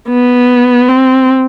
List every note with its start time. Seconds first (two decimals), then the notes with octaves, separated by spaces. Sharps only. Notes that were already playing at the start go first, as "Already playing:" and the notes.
0.09 B3
0.88 C4